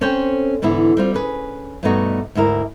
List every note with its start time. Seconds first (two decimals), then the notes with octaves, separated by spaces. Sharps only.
0.01 C4 C#4 A4 C5 C#5 G5
0.62 G#2 D3 E3 B3 E4
0.97 G3 C4 F4
1.14 C#4 G#4 B4
1.83 G2 B2 A3 B3 D#4 F#4
2.35 D2 G#2 E4 A#4